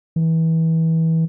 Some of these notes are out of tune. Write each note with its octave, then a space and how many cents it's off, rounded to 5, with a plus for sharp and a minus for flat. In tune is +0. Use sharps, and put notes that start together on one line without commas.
E3 -25